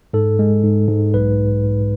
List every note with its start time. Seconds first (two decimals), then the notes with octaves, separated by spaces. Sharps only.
0.13 G#2 A4
0.39 G#3
0.63 G#2
0.88 G#2
1.14 B1 B4